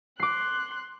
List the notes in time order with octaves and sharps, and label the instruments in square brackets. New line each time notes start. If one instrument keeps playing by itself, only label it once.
[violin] C6 F#6 [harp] D6 C7